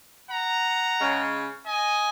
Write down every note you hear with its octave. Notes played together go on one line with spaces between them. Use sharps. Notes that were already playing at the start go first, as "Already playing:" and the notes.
F#5 A#5
C#3 G#3 C#4
D#5 G#5